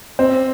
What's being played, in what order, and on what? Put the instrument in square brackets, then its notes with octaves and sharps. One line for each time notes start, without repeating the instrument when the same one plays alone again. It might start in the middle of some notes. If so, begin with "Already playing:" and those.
[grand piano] C4